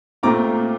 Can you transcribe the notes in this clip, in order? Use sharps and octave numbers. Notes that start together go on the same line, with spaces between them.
A#2 A3 C4 F4 A#5 D6